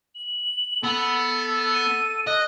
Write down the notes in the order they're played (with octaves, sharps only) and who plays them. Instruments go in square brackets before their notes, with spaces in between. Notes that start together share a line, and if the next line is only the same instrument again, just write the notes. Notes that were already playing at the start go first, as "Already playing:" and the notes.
[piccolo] F#7
[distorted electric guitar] B3 [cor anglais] A4
[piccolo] D#7
[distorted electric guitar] D#5 [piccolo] F#6